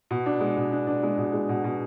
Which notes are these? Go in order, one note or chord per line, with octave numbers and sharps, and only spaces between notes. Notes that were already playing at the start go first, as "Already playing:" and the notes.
B2
D4
G#3
B2
D4
D4
G#3
B2
G#3
B2
B2